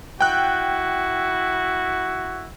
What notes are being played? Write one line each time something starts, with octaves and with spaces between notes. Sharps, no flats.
E4 F#4 G5 F#6